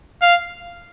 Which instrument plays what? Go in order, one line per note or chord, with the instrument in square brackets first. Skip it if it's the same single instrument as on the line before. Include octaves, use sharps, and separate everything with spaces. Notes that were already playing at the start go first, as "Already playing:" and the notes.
[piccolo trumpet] F5